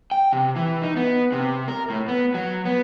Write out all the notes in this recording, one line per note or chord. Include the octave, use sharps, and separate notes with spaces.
G5
C3
E3
D#4
B3
C3
A#4
A2
B3
F#3
B3